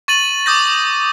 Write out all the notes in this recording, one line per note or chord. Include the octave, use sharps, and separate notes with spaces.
C#6 A6 D#7 F#7
D6 D#6 G6 A#6